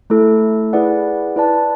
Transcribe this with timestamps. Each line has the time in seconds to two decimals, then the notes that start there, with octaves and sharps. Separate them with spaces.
0.10 A3 E4 A4
0.73 E4 G#4 B4 D5 F#5
1.36 E4 B4 D5 A5